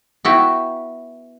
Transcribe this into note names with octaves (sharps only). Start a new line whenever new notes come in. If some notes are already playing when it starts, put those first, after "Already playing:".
B3 E4 F#4 E5 G5